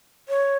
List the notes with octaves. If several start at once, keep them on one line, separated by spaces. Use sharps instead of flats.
C#5